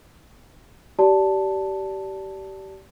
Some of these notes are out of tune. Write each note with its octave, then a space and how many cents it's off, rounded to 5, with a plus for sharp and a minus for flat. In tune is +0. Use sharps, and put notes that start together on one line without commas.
G4 -25 D5 -15 A5 +0